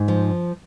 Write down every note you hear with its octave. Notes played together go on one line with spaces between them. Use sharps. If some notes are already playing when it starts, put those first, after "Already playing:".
Already playing: G#2
F3